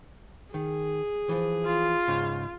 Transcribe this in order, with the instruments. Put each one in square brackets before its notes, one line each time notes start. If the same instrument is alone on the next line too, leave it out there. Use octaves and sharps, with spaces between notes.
[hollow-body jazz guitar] D#3 [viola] G#4
[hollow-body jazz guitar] E3 F3
[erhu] F4
[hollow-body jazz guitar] G#2 C#3